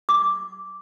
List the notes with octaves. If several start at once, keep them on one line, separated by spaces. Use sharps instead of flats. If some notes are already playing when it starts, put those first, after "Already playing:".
D6